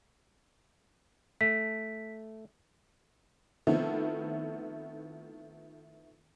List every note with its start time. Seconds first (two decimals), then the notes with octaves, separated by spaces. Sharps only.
1.41 A3 B6
3.67 D#3 F3 A3 B3 C4 E4